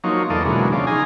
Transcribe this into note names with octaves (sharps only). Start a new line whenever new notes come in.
F3 F#3 A#3 D#4 C#5
E2 F3 A#3 A4 D5 D#5
B2 D3 E3 F#3 G#3 A#3
C#3 F3 D5
D#4 F4 G#4 G#5 A#5